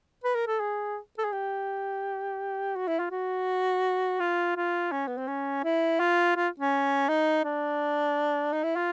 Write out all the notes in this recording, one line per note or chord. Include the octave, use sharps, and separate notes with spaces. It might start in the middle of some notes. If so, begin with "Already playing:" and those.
B4
A#4
A4
G#4
A4
G#4
G4
F#4
E4
F4
F#4
F4
F4
C#4
B3
C4
C#4
E4
F4
F4
C#4
D#4
D4
D#4
E4
F4